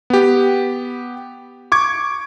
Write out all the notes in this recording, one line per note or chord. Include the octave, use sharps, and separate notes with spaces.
B3 G4
C#6 D6 G#6